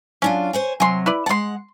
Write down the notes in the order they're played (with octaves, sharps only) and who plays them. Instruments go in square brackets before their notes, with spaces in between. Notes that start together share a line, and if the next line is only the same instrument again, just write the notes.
[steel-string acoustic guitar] F#3 D4 F4 [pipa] C#4
[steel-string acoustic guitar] C5 C#5 G#5
[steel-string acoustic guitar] C3 F#3 [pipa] G#5 C6
[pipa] E4 B4 D5
[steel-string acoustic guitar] G#3 F#5 [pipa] A5 C6